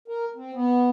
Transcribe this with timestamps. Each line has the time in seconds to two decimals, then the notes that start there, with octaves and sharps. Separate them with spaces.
0.08 A#4
0.36 C4
0.54 B3